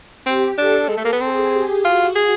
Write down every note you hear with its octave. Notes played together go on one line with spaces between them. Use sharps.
C4 G4
D4 A4
G#3
A3
A#3
B3
C4 G#4
G4
F4 F#4
G#4